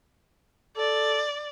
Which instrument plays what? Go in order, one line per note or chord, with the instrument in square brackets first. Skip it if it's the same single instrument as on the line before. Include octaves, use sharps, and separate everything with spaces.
[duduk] A4 [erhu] D5